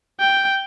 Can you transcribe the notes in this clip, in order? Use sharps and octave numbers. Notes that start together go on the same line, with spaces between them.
G5